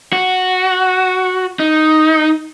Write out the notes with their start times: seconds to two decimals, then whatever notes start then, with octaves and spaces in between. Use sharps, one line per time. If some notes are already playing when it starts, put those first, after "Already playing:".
0.13 F#4
1.59 D#4